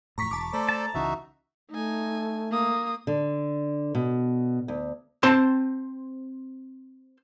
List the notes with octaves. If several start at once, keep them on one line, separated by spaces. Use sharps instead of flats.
F2 A2 A#5 C#6 B6
E1 A5 D6
A3 A4 C5 D5 A#5
A5
C#2 C#3 E3 D#4 F#4 E5
A3 D#4 G#5
A#3 D#6
D3
B2
D2
C4 C5 A5 C6